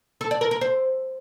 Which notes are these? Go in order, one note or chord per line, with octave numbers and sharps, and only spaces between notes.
A4
D5
A#4
A#4
C5